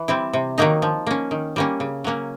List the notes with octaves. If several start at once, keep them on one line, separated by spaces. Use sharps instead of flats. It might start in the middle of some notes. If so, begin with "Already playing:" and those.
Already playing: E3
G3 C4 E4
C3
D#3 F#3 A#3 D#4
F3
A#3 C#4
D#3
G3 A#3 C#4
C#3
F#3 A#3 C#4